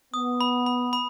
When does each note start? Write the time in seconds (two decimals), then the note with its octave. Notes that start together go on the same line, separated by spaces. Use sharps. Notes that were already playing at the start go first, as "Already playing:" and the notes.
0.14 B3 D#6
0.41 B5
0.66 B5
0.93 B5